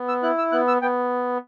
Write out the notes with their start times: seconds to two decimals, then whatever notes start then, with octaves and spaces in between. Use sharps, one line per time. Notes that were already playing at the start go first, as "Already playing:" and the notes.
Already playing: B3
0.08 E6
0.23 E4 F#6
0.38 E6
0.52 B3 F#6
0.68 E6
0.82 B3 G5